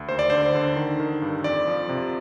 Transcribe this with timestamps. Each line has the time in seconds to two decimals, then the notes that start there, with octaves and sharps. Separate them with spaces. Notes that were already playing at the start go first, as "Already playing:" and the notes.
Already playing: D2
0.08 D#2 C5
0.19 D5
0.30 D3 C5
0.55 D3
0.76 D#3
1.00 D#3
1.22 G2
1.44 F2 D5
1.67 F3
1.89 C3